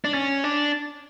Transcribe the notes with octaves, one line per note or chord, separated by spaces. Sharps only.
D4
C#4
D4